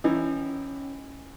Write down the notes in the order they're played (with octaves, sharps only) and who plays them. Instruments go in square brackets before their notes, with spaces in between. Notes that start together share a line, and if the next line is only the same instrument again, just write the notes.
[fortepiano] E3 D#4 [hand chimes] C#4